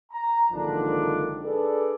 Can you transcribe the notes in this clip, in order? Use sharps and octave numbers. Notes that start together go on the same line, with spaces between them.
A#5
F#1 G#2 D3 D#3 F3 D4
D4 G#4 A4 B4 D5